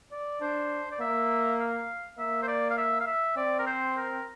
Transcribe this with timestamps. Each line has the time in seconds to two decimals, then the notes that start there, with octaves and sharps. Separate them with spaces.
0.12 D5
0.41 D4 C5
0.92 D5
1.00 A#3 E5
1.60 F5
2.19 A#3 E5
2.43 C5
2.48 D5
2.70 F5
2.78 E5
3.00 F5
3.07 E5
3.37 C4 D5
3.59 A#4
3.67 C5
3.97 A#4